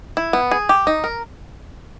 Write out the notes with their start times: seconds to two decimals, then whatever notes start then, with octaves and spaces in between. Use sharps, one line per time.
0.17 E4
0.33 B3
0.51 G#4
0.69 G4
0.87 D#4
1.04 A#4